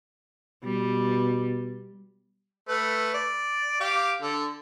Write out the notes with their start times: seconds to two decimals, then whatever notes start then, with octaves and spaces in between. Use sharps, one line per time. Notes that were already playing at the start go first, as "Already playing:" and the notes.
0.64 B2 G3
2.69 A3 B4
3.14 D5
3.80 G4 F5 D6
4.22 D3 A4